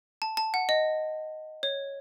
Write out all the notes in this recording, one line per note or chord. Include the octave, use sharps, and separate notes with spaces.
A5
A5
F#5
D#5
C#5